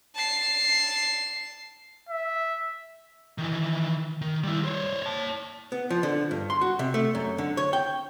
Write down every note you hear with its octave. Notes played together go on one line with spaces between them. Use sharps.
A5 C7
E5
D#3 E3
D#3
G3 E4
C5 C#5
C#5 A5
B3
F3
D3
G2
C6
F#4
C3
A3
F#2
D3
C#5
G5